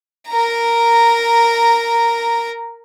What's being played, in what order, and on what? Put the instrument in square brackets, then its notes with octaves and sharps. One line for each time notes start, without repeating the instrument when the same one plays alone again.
[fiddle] A#4 A#5